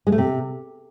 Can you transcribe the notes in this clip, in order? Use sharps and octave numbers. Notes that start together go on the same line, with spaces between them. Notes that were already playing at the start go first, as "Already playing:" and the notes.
G#3
A3
C3